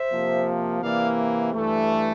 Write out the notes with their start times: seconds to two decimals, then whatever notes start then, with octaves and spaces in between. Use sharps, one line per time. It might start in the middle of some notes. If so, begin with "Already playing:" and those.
Already playing: C5 E5
0.09 C3 F3 A#3
0.81 C3 E3 A#3 D5 F5
1.54 G2 E3 A3